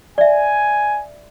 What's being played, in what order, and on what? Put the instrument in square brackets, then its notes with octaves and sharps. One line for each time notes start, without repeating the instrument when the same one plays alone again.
[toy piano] D5 E5 [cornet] G#5